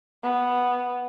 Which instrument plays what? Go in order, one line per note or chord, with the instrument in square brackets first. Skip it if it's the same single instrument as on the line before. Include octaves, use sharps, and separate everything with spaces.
[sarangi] B3